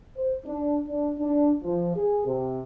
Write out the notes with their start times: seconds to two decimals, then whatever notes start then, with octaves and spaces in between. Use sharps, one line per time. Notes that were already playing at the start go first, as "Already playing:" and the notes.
0.17 C5
0.46 D4
0.87 D4
1.19 D4
1.64 F3
1.96 G#4
2.27 C3